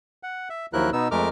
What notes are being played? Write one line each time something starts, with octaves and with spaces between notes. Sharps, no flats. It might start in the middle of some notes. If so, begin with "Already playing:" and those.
F#5
E5
D#2 F3 F#3 E4 A#4 F#6
B2 B3 D#4 E6
F2 G#3 A3 A#4 D6 F6